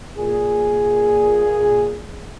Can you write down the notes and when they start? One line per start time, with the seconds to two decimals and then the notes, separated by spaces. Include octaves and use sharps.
0.17 A#2 G#4